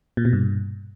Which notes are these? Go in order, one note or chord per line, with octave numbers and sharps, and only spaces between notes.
A#2
B2
G2